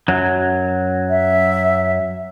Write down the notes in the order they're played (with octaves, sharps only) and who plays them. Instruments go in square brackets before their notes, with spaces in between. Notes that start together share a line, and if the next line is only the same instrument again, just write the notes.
[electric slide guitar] F#2 F#3
[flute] E5